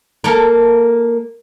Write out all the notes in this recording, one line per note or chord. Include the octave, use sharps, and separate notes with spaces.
A#3 A4 A#4